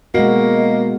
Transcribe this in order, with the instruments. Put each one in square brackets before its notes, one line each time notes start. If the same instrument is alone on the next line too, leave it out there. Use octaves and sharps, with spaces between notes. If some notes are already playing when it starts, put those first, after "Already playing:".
[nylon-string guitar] B2 [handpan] G#3 F#4 [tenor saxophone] A#3 [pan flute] D#5